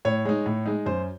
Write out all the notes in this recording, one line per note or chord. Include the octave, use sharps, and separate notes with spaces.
A2 C#5
G#3 D#4
A2
G#3 D#4
F#2 C5